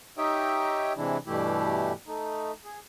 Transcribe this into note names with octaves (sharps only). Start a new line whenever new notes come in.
D#4 G4 C#5 D#5 E5 G5
C3 E3 G#3 D4 E4
G2 B2 E3 A3 E4 G4
A3 D#4
G#4